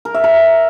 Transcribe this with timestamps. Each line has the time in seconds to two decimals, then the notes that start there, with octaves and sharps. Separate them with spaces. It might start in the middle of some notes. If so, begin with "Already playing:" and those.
0.05 A#4
0.14 E5
0.24 A#4